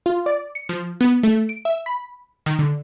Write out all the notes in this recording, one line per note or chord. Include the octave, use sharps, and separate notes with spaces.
F4
D5
C#7
F3
B3
A3
D7
E5
B5
D#3
D3